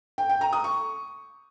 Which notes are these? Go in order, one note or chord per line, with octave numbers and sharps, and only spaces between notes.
G5
G5
A#5
D#6
C#6